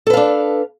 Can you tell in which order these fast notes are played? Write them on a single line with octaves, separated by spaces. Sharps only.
A4 B4 F5 D4